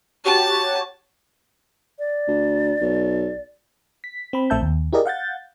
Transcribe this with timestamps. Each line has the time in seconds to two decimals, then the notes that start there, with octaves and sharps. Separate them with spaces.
0.24 F#4 G4 C#5 A5
1.99 D5
2.28 D2
2.81 B1
4.04 B6
4.33 C4 B5
4.50 A#1 A3 C4 E5 A5 G6
4.62 D#2
4.93 E4 G4 G#4 A#4 D5 D#5
5.06 F5 F#5 G6 A6